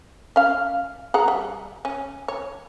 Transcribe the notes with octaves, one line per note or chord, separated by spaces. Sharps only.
C#4 F5
G#4 F#5 A#5
G3
C#4
C#5